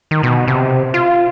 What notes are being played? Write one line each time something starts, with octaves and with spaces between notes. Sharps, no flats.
D#3
B2
C3
F4